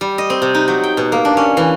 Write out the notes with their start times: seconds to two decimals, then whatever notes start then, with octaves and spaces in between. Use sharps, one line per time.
0.01 G3
0.18 D#5
0.30 C4
0.42 C3
0.55 D#4
0.68 F#3
0.84 G5
0.97 B2
1.12 A#3
1.25 D4
1.37 C#4
1.57 E3